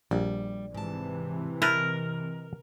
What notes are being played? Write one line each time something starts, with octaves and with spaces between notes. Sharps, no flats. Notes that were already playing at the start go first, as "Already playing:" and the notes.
A#1 G3
G#2 C3 E3 A5
E4 A#4 B4 D#5 A5